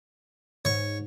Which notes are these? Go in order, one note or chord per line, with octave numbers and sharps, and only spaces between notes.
G#2 C#5